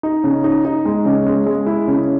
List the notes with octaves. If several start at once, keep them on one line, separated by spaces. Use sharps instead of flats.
D#4
C#3
D#4
D#4
G#3
C#3
G#3
G#3
E4
C#3